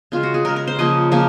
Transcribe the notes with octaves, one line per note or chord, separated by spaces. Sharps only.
C#3 G#3 F4
F#4
G#4
C#3 G#3 A#4
A#4
C5
C#3 F3 A#3 D#5
C#3 F3 A#3